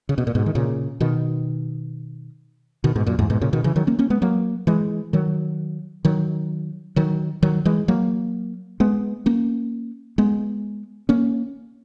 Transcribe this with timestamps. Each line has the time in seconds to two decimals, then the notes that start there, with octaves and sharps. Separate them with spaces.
0.09 C#3
0.18 B2
0.27 A#2
0.35 G#2 B2
0.46 D#3
0.55 A#2 C#3
1.00 B2 D#3
2.84 B2 D#3
2.96 G#2 B2
3.07 F#2 A#2
3.19 E2 G#2
3.30 G#2 B2
3.41 A#2 C#3
3.53 B2 D#3
3.64 C#3 E3
3.76 D#3 F#3
3.87 A#3 C#4
3.99 A#3 C#4
4.10 G#3 B3
4.22 F#3 A#3
4.67 E3 G#3
5.13 D#3 F#3
6.05 D#3 F#3
6.96 D#3 F#3
7.43 D#3 F#3
7.65 E3 G#3
7.88 F#3 A#3
8.80 G#3 B3
9.26 A#3 C#4
10.18 G#3 B3
11.09 A#3 C#4